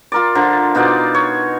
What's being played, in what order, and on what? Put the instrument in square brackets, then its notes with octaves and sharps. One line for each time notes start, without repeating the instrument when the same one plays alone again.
[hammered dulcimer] F4 A#4 D5
D3 F3 A#5
B2 D#4 F4 D5
C#5